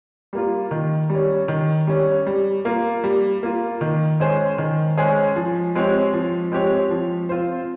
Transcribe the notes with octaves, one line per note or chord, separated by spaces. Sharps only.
G3 A#3 F4
D#3
G3 C#4
D#3
G3 C#4
G3
A#3 F4
G3
A#3 F4
D#3
G#3 C#4 G#4 C5
D#3
G#3 C#4 G#4 C5
F3
G#3 C4 G4 C#5
F3
G#3 C4 G4 C#5
F3
C4 F4 C5